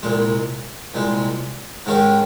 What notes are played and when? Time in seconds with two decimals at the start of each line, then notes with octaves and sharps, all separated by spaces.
0.03 C2 A#2 G#3
0.94 C2 A#2 G#3
1.86 G#2 D#3 G#3 C#4 G4